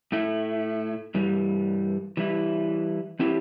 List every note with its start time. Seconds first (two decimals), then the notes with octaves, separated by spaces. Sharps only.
0.12 A2 A3 E4
1.15 G2 E3 G3
2.17 E3 G3 E4
3.19 E3 C4 E4 G4